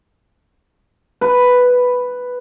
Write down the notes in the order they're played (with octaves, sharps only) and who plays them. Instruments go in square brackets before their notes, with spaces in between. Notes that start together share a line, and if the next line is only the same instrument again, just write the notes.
[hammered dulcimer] B4